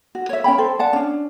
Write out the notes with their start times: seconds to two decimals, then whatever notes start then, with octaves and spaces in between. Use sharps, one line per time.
0.15 F#4
0.29 C#5 E5
0.44 C#4 C5 G5 B5
0.58 A4 C5
0.79 D5 F#5 A5
0.93 C#4 D4